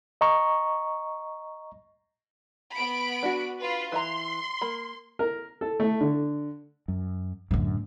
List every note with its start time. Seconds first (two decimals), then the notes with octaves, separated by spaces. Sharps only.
0.21 D#5 A#5 C#6
2.75 B3 B5 D7
3.23 D4 F#4
3.60 F4 B4
3.92 E3 E5 A#5 C6
4.61 A#3 B5
5.19 A#4
5.61 A4
5.80 A3
6.01 D3
6.88 F#2
7.51 F#2 A2 D3